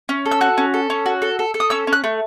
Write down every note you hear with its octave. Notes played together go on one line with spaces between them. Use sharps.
C#4
A4
E6
F#4 F#6
C#4
A4
C#4
F#4
A4
A4
A4
D#6
C#4 E6
C#4
F#6
A3